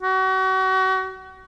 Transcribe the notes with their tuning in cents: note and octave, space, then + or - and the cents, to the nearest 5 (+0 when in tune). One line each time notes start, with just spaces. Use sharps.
F#4 +35